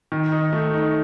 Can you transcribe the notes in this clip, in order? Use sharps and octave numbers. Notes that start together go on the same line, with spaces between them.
D#3
D#4
A3
D#4